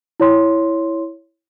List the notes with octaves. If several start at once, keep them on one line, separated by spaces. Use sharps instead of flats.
E4 C#5 C6